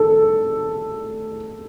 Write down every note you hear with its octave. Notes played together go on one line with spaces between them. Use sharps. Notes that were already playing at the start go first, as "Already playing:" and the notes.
Already playing: A4